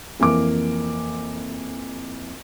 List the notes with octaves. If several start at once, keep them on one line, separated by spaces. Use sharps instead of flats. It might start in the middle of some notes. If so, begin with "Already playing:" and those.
F2 E3 A#3 D6